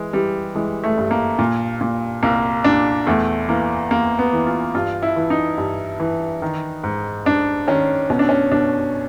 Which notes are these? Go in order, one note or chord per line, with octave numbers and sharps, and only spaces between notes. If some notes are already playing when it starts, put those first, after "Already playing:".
Already playing: E3 G#3
E3 G3
E3 G#3
A3
G2
A#3
A#2
A#2
C2 A#3
A#2 D4
E2 A3
E3 A#3
E2 A#3
B3
E3
F4
G2 F4
E4
E3
D#4
G2
E3
D#3
G#2
G#2 D4
D#3 C#4
B2 C#4
D4
C#4
B2 D4